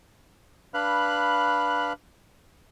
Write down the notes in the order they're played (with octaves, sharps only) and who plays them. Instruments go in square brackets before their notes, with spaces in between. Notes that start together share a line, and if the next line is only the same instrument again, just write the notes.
[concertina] D4 B4 F5 B5 F#6